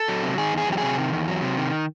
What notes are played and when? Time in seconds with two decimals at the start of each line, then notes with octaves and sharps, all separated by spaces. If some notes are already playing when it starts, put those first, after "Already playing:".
Already playing: A4
0.08 F#3
0.23 C3
0.38 D#3 G#4
0.52 E2
0.57 G#4
0.68 F#3 G4
0.78 G#4
0.83 C3
0.98 D#3
1.13 E2
1.27 F#3
1.42 C3
1.57 D#3